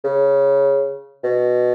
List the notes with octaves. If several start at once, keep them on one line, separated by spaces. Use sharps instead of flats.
C#3
B2